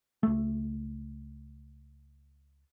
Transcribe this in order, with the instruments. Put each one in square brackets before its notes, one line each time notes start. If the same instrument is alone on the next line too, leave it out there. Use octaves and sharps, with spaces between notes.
[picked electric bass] C#2 A3